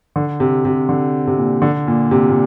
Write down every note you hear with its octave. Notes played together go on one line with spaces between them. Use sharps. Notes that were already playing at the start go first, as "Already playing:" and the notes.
D3
C3
C3
D3
C3
A#2
D3
A#2
C3
A#2